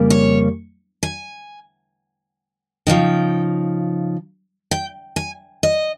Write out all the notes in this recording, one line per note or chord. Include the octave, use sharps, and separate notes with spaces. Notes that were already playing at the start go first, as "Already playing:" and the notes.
Already playing: F2 C#3 G3 A#3
C#5
G#5
C#3 F3 G#3 D#4 G5
G5
G#5
D#5